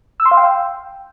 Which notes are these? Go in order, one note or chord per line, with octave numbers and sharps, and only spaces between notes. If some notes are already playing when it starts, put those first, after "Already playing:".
E6
C6
F5
G5